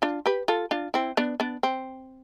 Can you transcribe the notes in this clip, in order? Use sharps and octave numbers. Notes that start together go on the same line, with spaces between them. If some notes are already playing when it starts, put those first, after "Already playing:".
D4 F4
G4 B4
F4 A4
D4 F4
C4 E4
B3 D4
B3 D4
C4